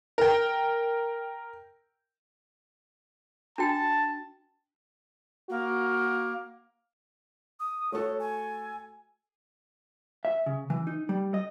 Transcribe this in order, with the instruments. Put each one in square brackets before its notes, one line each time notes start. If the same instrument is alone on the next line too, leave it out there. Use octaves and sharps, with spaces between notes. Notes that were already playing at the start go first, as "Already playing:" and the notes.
[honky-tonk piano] A#4 G5
[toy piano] D4 F#4 G5 [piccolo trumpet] A5
[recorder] A#3 [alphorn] F#4
[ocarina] D#6
[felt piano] A3 F#4 A4 [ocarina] C#5
[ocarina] G#5
[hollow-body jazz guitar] E5
C#3
E3
D#4
G3
D#5